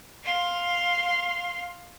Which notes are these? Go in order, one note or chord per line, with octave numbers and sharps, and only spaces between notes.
F5 C6